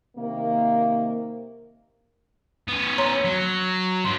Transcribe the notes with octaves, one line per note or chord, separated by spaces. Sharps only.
C3 D#3 A#3
B3 C#4
C#5 A#5 C6
F#3
G2 C6